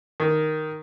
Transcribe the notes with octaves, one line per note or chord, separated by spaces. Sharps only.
D#3